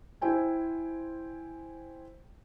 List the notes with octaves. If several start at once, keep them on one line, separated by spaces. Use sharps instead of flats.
E4 C5 G5 G#5